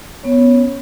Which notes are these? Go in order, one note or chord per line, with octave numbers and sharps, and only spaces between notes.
B3 C#4 C#5